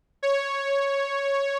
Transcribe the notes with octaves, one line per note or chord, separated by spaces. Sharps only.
C#5